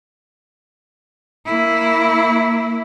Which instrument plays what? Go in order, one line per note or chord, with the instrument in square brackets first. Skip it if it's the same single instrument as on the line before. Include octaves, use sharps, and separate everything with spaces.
[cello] A#3 E4